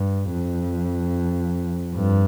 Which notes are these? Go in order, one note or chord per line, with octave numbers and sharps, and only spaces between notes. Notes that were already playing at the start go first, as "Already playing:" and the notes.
Already playing: G2
F2
G2